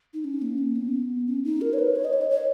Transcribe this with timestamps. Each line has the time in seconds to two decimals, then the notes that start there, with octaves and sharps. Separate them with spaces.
0.14 D#4
0.24 C#4
0.42 A#3
0.58 C#4
0.76 B3
1.27 C#4
1.44 D#4
1.61 A#4
1.73 C#5
1.79 B4
1.96 C#5
2.04 D#5
2.13 C#5
2.21 D#5
2.30 C#5